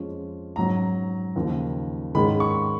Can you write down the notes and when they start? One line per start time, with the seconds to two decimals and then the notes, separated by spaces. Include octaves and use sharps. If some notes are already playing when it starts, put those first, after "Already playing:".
Already playing: F2 F3 G#3 C#4
0.56 G#2 F#3 C#4 A#5
1.36 D#2 C#3 F3
2.14 G#2 D#3 G#3 C#4 B5
2.40 C#6